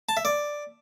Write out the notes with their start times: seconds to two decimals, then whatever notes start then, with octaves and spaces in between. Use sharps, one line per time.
0.09 A5
0.17 E5
0.25 D5